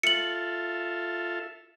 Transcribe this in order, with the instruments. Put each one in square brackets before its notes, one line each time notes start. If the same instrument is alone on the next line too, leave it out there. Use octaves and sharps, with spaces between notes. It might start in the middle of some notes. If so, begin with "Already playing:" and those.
[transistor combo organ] F4 A4 E5 [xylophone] C#7 F#7